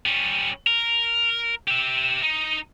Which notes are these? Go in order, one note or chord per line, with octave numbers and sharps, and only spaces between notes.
G3 C#4
A#4
G4 E5
D#4